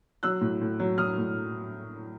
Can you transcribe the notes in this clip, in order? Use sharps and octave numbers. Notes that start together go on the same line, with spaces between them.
F#3 E6 F#6
A2
A2
F#3
F#3 D#6 F6
A2